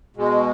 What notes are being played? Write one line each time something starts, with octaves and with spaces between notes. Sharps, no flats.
B2 G#3